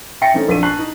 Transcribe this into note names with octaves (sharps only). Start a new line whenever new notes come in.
E5 G5 A6 A#6 C#7
E3 A3 C4 C#4 D#4
A#1 B6 D#7
A5 C#6 F#6 C7 F#7
D#4